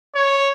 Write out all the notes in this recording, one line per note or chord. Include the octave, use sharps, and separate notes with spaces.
C#5